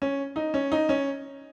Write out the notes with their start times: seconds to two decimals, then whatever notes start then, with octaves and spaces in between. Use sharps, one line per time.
0.02 C#4
0.36 D#4
0.54 C#4
0.72 D#4
0.89 C#4